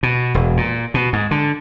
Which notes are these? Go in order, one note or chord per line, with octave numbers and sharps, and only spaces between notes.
B2
E1
A#2
B2
G#2
D3